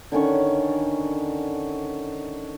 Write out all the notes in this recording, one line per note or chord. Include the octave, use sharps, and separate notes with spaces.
D3 D#3 C#4 C#6